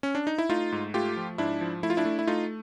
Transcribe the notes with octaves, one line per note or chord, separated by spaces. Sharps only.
C#4
D4
D#4
E4
A3 D#4 F4
G#2
A3 F4 G4
F3
G#2 D4 E4
F3
A3 E4
F4
D4 E4
A3
E4
A3 D#4 F4